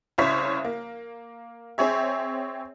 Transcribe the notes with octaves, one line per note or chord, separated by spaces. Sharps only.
C2 C#3 E4 C5 C#5 B6
A#3
C4 G#4 C#5 E5